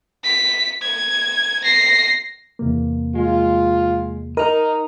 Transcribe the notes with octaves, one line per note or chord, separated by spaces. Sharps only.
B6
G#6
A#6 C7
E2 C3 A#3
G#3 F4
D#4 A#4 D#5 A#5